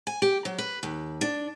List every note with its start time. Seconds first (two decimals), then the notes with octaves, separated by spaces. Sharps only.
0.07 G#5
0.22 G4
0.45 F#3
0.58 B4
0.83 D#2
1.21 D4